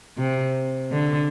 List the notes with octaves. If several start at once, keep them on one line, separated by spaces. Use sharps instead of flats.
C3
D3